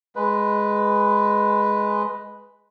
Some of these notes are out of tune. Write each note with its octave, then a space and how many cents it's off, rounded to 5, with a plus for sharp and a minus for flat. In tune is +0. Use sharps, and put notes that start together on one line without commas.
G#3 +0 B4 +0